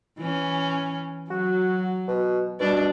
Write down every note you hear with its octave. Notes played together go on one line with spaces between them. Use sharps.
E3 C#4
F#3 F#4
B2
B2 G3 D4